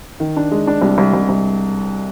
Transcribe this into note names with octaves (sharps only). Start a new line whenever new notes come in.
D#3
D4
G#3
D4
C2
C2
C2
C2